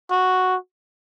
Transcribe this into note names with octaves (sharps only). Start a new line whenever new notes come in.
F#4